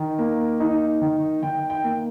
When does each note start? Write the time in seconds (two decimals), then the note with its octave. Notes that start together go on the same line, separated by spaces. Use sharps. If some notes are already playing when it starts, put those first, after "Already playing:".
Already playing: D#3
0.19 A#3
0.60 D#4
1.02 D#3
1.42 D#3 G5
1.70 G5
1.84 A#3